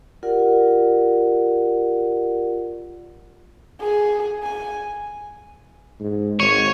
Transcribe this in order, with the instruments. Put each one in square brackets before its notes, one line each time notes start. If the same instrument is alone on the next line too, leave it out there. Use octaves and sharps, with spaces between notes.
[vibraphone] F4 G4 A#4 D5 F#5
[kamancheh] G#4
G#5
[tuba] G#2
[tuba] G#1 [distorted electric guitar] C#5 [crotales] C#6